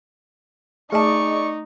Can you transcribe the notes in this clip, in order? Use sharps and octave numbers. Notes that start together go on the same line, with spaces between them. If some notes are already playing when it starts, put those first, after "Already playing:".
A3 D#4 G#4 D5 D#5 A5 C#6